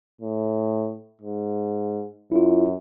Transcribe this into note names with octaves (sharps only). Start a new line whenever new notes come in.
A2
G#2
F#2 E4 F4